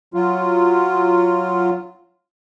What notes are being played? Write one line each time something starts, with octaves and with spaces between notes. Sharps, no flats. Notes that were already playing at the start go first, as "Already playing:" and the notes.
F#3 F4